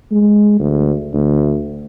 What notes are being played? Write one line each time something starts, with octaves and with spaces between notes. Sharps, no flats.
G#3
D2
D2